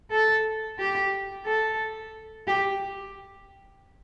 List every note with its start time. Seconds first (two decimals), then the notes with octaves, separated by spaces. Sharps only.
0.11 A4
0.79 G4
1.46 A4
2.47 G4